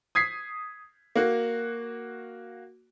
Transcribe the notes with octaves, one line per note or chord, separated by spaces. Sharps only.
D#6 G#6 B6 C7
A#3 F#4